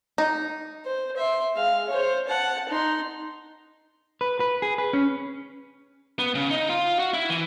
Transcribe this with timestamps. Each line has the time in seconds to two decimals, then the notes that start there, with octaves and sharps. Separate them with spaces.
0.18 D#4
0.85 C5
1.17 E5 C6
1.55 G#3 F5
1.89 C5 C#5
2.28 F#5 A5
2.69 D#4 C6
4.21 B4
4.40 B4
4.62 G#4
4.78 B4
4.93 C#4
6.19 B3
6.35 C#3
6.51 D#4
6.69 F4
6.99 F#4
7.14 E4
7.30 E3